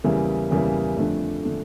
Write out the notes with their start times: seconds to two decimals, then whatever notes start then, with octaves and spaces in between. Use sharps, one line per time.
0.04 E2 C#3 G3 A#3 E4
0.51 E2 C#3 G3 A#3 E4
0.97 F2 D3 A3 D4
1.43 D3 A3 D4